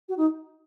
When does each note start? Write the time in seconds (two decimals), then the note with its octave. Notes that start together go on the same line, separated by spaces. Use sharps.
0.09 F#4
0.17 D#4